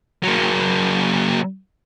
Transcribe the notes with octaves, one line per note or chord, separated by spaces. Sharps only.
F#3 A#3